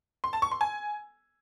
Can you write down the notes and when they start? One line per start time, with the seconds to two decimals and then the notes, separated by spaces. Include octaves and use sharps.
0.24 C6
0.33 A5
0.42 C#6
0.51 C6
0.61 G#5